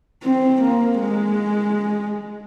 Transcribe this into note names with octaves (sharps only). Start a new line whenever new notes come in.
C4
A#3
G#3